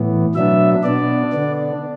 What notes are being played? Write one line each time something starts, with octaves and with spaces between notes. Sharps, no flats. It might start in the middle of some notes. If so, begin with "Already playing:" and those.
Already playing: A2 E3 B3
B2 F#3 B3 D4 E5
B2 B3 D4 D5
D3 B3 D4